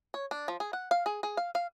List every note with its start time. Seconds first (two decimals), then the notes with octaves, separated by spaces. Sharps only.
0.14 C#5
0.31 D4
0.48 F3
0.60 G#4
0.73 F#5
0.91 F5
1.06 G#4
1.23 G#4
1.37 F5
1.55 F5